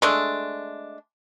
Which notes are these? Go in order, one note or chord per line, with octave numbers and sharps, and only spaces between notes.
G#3 A3 D4